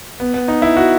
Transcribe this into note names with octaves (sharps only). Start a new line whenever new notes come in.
B3
B3
D#4
E4
F#4